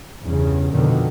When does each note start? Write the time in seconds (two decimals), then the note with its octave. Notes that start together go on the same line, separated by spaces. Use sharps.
0.23 E2 G2 C#3
0.72 F2 B2 D3 D#3